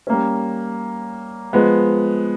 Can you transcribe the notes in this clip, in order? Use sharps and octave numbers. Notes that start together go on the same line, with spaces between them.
G3 A#3 C#4
F3 G#3 B3